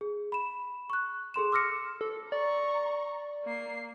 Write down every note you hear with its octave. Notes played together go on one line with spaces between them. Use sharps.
G#4
B5 E7
C#6 F#6
G#4 A4 C6 E7
D6 E6 F6 A#6 C#7
A4
D5 A#5 C#6
A#3 C7